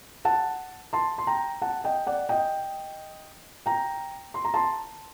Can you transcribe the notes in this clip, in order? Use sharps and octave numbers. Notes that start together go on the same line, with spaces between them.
F#5 A5
A5 C6
C6
G5 A#5
F#5 A5
D#5 G5
D5 F#5
D#5 G5
G5 A#5
C6
A#5
A5 C6